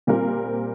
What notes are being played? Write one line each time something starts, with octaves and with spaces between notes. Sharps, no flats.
A#2 G3 C4 F4 A#4